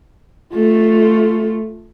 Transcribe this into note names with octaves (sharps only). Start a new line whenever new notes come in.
A3 F4